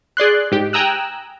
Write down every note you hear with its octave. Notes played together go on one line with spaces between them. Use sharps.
G#4 D5 C6 F#6
G#2 G4
G5 G#5 A#5 D#6 E6 F#6